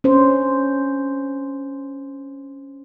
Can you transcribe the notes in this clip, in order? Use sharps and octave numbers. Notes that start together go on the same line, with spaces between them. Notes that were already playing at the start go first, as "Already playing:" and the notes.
C#4 D4 C5